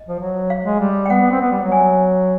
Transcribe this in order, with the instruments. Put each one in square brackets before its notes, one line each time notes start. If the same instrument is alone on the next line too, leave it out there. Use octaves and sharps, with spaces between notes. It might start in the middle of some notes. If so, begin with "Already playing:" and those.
Already playing: [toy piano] D#5
[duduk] F3
F#3
[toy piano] F5
[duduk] G#3
G3
[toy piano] G5
[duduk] B3 [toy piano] F#5
[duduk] B3
C4
B3
G3
F#3
[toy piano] G#5